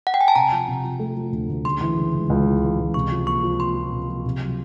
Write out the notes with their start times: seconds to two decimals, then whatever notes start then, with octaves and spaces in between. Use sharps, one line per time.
0.07 F#5
0.14 G5
0.21 G#5
0.28 A5
0.35 C3 A#5
0.52 F3
0.68 C3
0.84 F3
0.99 A3
1.16 F3
1.32 D2
1.49 D2
1.65 C#3 C6
1.81 E3
1.97 C#3
2.14 C#2
2.30 C#2
2.46 E3
2.63 E3
2.79 C#2
2.94 C3 C#6
3.11 F3
3.27 A#3 C#6
3.43 F3
3.59 A#3 C6
3.76 F3
3.92 C3
4.09 F3
4.25 C3
4.41 F#3